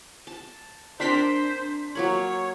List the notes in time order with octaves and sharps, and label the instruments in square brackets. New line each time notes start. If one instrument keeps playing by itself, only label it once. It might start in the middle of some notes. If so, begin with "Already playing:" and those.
[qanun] A5
[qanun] C4 A#4 A#5 [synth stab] D4 C6 B6 [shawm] C5
[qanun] F#3 A#3 B5 [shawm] C#5